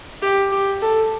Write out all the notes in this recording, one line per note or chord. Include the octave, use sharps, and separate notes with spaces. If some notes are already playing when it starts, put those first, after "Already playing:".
G4
G4
A4